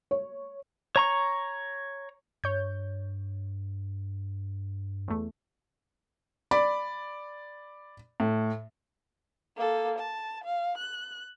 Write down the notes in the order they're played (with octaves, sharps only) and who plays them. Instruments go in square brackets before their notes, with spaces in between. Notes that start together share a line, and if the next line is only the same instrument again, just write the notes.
[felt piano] C#5
[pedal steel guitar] C#5 A#5 C#6
[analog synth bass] G2 [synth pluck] C#5 G6
[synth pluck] E2 A3
[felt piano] D5 B5 D6
A2
[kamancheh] A#3 A4
A5
F5
F#6